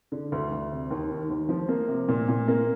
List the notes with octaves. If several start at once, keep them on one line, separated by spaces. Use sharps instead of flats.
D3
D2
D2
C3
D#2
D#3
D#2
F3
A#3
C3
A#2
A#2
A#3